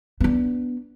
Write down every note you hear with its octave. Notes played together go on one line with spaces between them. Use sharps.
B3 D4